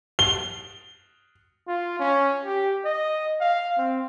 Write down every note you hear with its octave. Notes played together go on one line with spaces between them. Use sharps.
G7
F4
C#4
G4
D#5
F5
C4